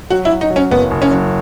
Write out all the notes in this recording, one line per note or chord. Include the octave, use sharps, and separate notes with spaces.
F#3 F#4
E4
F#3
D#4
F#3
C#4
F#1 B3
F#1
C#4
F#3